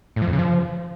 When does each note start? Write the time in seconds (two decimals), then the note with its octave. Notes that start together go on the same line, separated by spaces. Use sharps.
0.16 A2
0.22 F3
0.28 F2
0.33 C#3
0.39 F3